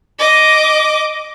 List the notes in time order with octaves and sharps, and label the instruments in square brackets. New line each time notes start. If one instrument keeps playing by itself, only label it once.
[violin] D#5 D6